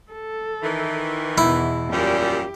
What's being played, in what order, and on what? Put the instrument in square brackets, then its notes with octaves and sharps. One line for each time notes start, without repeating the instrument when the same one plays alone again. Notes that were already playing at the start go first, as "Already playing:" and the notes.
[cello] A4
[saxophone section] D#3 E3
[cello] E2 B2 [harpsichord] E4
[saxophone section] F#2 A#2 G3 [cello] G4